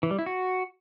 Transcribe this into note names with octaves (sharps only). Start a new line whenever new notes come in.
E3
G3
E4
F#4